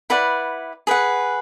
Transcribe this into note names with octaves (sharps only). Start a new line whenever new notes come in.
E4 B4 D5 F#5
G#4 B4 F#5